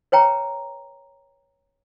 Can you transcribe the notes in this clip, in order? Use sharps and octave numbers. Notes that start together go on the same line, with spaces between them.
B4 C#5 G5 A#5